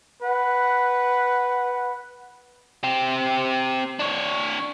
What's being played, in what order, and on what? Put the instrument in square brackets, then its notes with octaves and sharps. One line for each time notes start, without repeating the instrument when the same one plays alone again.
[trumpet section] B4 F#5
[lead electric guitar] C4 G4
D4 C#5